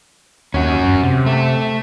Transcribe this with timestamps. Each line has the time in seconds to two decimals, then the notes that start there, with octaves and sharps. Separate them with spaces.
0.54 D#2 C#4 F#4
0.84 F#2
1.03 C3
1.26 A3